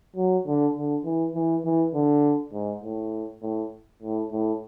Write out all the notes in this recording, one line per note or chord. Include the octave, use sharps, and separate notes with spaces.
F#3
D3
D3
E3
E3
E3
D3
G#2
A2
A2
A2
A2